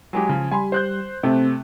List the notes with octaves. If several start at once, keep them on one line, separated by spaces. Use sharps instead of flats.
F#3 G#3 G4 G#5
C#3 F3
G3 G#5 B5 C6
C5 F#6 G6
C3 A3 C4